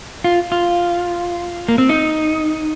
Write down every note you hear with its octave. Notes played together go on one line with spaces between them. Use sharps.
F4
F4
A#3
C4
D#4